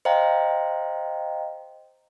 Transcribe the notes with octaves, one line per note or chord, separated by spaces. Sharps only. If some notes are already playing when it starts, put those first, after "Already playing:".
C5 D#5 F5 G5 A#5